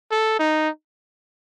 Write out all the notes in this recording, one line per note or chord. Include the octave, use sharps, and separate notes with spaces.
A4
D#4